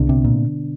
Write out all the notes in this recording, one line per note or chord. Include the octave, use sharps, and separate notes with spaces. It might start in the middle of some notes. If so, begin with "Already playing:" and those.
Already playing: C2 B2 D3 B3 D4
C3
A#2